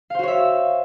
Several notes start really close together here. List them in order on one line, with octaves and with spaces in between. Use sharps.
F5 C5 F#4 C#5 E5